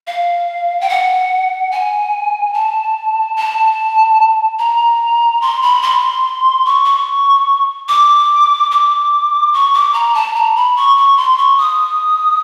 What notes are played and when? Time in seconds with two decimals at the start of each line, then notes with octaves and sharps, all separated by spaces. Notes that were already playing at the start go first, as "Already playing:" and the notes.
0.07 F5
0.81 G5
0.89 F#5
1.71 G#5
2.54 A5
3.36 A5
4.59 A#5
5.41 C6
5.62 B5
5.82 C6
6.65 C#6
6.85 C#6
7.88 D6
8.71 D6
9.53 C#6
9.73 D6
9.93 A#5
10.14 A5
10.35 A#5
10.56 B5
10.76 C#6
10.97 C#6
11.17 C6
11.38 C#6
11.58 D#6